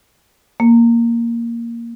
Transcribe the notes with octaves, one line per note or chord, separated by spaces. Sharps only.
A#3